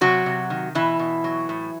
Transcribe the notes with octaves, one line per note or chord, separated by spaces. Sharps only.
C3 F#3 F#4
C3
D#3
B2 E3 E4
B2
F#3
A2